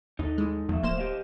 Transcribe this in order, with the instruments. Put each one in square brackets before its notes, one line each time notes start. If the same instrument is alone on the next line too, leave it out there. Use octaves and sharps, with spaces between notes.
[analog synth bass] D#2 [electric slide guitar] D#4 A4
[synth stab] E3 G#3
[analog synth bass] E2 [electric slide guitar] F3 A3 E5
[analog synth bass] D1 [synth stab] A#3 C5 E7
[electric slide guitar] G4 D#5 F5